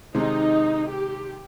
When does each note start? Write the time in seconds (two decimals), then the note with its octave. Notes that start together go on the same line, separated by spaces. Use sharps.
0.15 C3 D#3 G#3 C4 D#4
0.89 G4